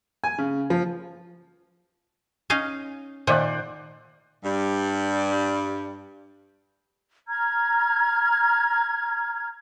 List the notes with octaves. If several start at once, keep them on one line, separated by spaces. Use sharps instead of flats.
G#5
C#3
F3
C#4 D#4 F5
A#2 D#3 A3 C5 D5 F#5
G2 G3
A#5 F6 G#6